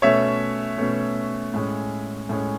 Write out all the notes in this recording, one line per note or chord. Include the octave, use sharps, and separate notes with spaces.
B2 A3 C#4 C#5 E5
B2 A3 C#4
A2 G#3 C#4
A2 G#3 C#4